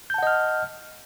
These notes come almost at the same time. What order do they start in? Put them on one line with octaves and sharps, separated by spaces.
G6 A5 F#5 D#5 F6